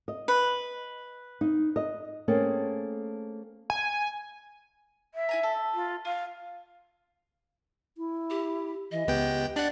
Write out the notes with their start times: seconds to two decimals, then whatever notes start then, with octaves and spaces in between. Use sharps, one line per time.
0.08 D#5
0.28 B4
1.41 D#4
1.76 D#5
2.28 A3 A#3 C4 C#4 G#4 A4
3.70 G#5
5.15 E5
5.29 E4 G#5 A#5
5.43 A4
5.74 F4
6.05 F4 F5
7.98 E4
8.30 G4
8.91 E3 D#5
9.07 C#2 B3 G4 G5
9.56 D4 D5 F#5